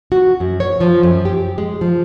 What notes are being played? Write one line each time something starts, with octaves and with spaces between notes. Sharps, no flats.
F#4
F#2
C#5
F3
F#2
G4
G#3
F3